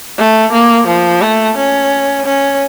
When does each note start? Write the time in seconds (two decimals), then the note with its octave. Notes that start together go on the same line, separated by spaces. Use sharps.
0.18 A3
0.52 A#3
0.87 F3
1.22 A3
1.57 C#4
2.26 C#4